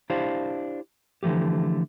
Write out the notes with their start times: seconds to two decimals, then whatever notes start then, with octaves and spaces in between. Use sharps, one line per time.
0.10 D4 E4 G4 C5 F5
1.23 D3 E3 F3 A3 G4